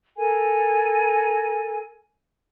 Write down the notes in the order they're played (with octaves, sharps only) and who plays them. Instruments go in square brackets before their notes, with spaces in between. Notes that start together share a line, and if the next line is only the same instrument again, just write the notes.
[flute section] A4 A#4 G#5